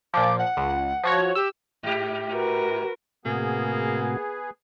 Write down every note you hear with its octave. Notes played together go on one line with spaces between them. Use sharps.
A#2 F3 D6
F#5
C#2
F3 F#4 C#5
G4 E6
G#2 G4
F#4 A#4 B4
A2 C3 A#3 B3 F#4 G#4